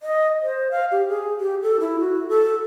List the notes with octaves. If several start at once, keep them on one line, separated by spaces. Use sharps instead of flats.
D#5
C5
F5
G4
G#4
G4
A4
E4
F#4
A4